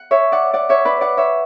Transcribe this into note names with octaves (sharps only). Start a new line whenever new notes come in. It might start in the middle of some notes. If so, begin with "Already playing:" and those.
Already playing: F#5
C#5 E5
D5 F#5
D5 F#5
C#5 E5
B4 D5
D5 F#5
C#5 E5